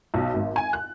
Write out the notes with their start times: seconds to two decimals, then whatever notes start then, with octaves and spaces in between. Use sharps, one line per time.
0.14 B1
0.34 G#1
0.56 G#5
0.73 F#6